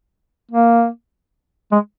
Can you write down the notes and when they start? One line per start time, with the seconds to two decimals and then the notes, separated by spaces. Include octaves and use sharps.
0.51 A#3
1.72 G#3